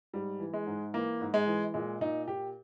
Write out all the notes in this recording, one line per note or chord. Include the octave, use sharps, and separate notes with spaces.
G#2 G3
E3
G#3
G#2
E3 A#3
G#2
G#3
E3
A#2 G#3
A#2 D#4
A#2 G4